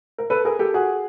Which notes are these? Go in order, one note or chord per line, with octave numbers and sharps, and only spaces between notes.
A#4
A4 B4
G#4 A#4
G4 A4
F#4 G#4